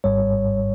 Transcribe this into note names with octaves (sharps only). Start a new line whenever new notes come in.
G#1 G#2 G3 C#5